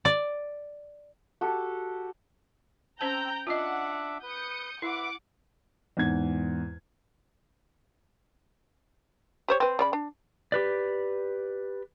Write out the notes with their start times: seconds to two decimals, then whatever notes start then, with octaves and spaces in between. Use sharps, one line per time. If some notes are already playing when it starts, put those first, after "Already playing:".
0.05 D5
1.41 F#4 G4 A4
3.01 C4 C#4 C5 G5 A5 A#5 E6 G6
3.47 D4 F4 D#5 E5 F#5 D6
4.23 B4 D#6 G6 C#7
4.82 E4 B4 E5 F#5 D6
5.97 E2 G#2 G#6
9.48 G4 C5 C#5
9.60 C4 B4
9.79 C#3 D5 B5
9.93 D4
10.52 G4 B4 D5